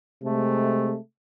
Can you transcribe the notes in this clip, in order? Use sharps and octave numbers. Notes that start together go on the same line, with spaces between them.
C3 G#3 A3